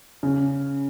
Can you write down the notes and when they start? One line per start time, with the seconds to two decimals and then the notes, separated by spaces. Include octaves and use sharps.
0.23 C#3